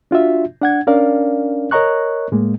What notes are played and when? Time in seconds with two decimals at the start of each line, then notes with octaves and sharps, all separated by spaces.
0.11 D4 F4 F#4 E5
0.61 D4 F#5 G#6
0.87 C#4 D4 A#4 D5 F5
1.71 A#4 C#5 D#5 A#5 C#6 F#6
2.32 A2 G#3 A#3